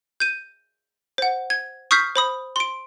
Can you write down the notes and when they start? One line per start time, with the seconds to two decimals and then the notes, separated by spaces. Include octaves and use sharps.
0.20 G6 D#7
1.18 C5 F#5
1.50 G#6
1.91 C#6 D#6 F6 G6 B6 C7
2.16 C5 B5 D#6
2.56 C6 D7